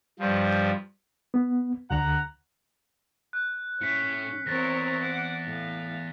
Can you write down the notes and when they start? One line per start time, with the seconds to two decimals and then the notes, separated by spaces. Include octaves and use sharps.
0.19 G2 F3
1.34 B3
1.91 D2 D3 F#5 A#5
3.33 F#6
3.81 A2 C#4 B6 C#7
4.47 E2 C4 A#4 C#5 A6 A#6
5.02 F#5 D6
5.46 A2 F5